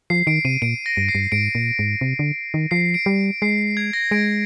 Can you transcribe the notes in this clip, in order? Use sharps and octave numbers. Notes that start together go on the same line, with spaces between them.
F3 C7
D#3 D7
C3 D#7
A#2 D7
A#6
G2
C7
G2
G#2 D7
A#2
G#2
C3
D3
D#3
F3 C7
D7
G3
G#3 C7
G#6
A#6
G#3 D7